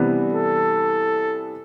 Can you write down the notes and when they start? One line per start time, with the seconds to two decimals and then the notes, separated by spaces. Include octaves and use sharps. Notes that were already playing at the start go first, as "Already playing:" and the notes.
Already playing: C3 E3 G3 B3 D4
0.33 A4